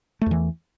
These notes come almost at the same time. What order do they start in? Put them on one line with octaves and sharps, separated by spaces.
A3 E2 E3